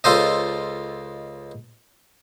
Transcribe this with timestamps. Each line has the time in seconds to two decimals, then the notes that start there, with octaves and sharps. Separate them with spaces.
0.04 C#2 F4 A4 C5 D#5